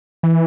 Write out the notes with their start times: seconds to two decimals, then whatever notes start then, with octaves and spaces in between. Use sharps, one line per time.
0.23 E3